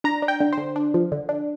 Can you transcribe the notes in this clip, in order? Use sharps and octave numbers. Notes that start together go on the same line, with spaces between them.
D4 A#5
D4
G5
D3
C5
D3
D4
F3
D3
D4